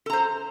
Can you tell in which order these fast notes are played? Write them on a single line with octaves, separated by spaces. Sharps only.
A4 A#5 C5